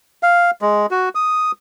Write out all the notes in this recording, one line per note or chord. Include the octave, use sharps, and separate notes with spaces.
F5
G#3
F#4
D#6